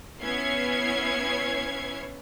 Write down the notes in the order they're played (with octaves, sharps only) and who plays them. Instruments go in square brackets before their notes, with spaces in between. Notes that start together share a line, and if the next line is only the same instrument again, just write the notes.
[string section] B3 C#4 E4 C#5 G#6 C7